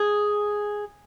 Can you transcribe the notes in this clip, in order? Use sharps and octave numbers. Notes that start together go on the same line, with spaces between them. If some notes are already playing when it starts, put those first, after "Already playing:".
Already playing: G#4